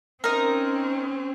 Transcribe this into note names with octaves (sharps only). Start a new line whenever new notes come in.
C4 C#4 D#4 A#4